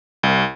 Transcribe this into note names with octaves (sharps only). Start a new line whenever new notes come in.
C2